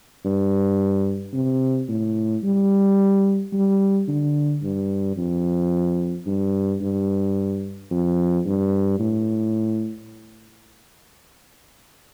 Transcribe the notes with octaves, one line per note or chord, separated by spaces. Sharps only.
G2
C3
A2
G3
G3
D3
G2
F2
G2
G2
F2
G2
A2